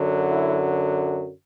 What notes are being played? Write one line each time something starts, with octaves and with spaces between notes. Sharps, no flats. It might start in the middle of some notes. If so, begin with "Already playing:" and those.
Already playing: F#2 D3 F#3
E4